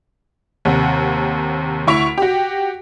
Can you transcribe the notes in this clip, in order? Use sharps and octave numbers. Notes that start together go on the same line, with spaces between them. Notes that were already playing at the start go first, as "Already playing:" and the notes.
D#2 C3 F#5
D2 E4 C#6 B6 D7 F7
F#4 G4